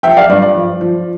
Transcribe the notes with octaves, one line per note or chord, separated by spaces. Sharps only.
F3 E5 G5
D5 F5
G2 D5
D5
F3
F3